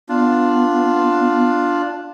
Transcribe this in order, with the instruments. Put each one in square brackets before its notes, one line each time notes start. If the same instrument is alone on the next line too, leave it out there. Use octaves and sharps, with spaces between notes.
[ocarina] B3 [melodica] D4 F4